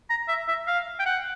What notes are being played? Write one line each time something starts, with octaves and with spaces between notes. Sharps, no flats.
A#5
E5
E5
F5
G5
F#5